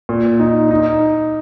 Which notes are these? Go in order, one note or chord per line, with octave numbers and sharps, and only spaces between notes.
A#2
D#4
D#4